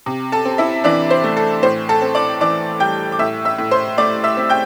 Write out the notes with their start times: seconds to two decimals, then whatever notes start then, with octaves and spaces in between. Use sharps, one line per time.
0.06 C3
0.32 A4 A5
0.45 C4
0.58 E4 E5
0.84 E3 D4 D5
1.11 C5
1.24 A3
1.37 A4
1.63 A2 C5
1.89 A4 A5
2.02 C4
2.15 D5 D6
2.41 E3 D5 D6
2.80 G3 G5 G6
3.12 D6
3.19 A2 E5 E6
3.45 E5 E6
3.58 A2
3.71 C5 C6
3.98 A3 D5 D6
4.24 E5 E6
4.37 C4
4.50 G5 G6